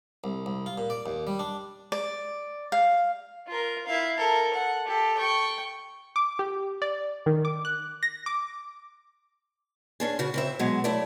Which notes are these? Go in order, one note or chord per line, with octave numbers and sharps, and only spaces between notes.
C2
C2
F4
A#2
D5
D#2
G3
D4
D5
F5
F4 A#4
E4 F5
A4 A#4
F#5
G4 A4
G5 C#6
D6
G4
D5
D#3
D6
F#6
A#6
D6
C#4 D4 G#4
C#3 F#4
C#3 C4 E5
B2 F#3 G#3
A3 E4 C#5 D5